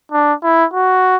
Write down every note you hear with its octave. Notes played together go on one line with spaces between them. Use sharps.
D4
E4
F#4